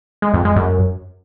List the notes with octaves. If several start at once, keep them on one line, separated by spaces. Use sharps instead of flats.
G#3
F2
G#3
F#2